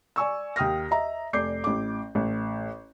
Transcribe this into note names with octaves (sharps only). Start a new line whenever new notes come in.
D5 G#5 C#6 E6
D#2 G5 D#6 F6 A#6
D#5 E5 A#5
F1 D5 D6 G6 C7
A1 D6
A1